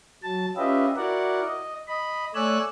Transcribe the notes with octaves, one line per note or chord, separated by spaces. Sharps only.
F#3 A5
C#4 F4 G4 B4 D#5 E5
E4 F#4 A#4 D5 F#5
D#5
D#5 B5
A3 C#5 D5 G#5 E6 F#6